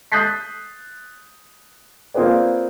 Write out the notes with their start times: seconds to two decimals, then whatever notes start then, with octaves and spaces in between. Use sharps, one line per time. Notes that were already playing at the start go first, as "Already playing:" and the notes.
0.12 D#6 F#6 G6 A6 B6 C7
2.14 A#3 C4 F4 G#4 B4 D5